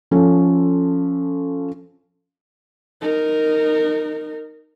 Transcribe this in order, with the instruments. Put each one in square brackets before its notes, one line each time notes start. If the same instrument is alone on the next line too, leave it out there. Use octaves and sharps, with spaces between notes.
[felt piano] F3 C#4 A4
[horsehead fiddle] D#4 A#4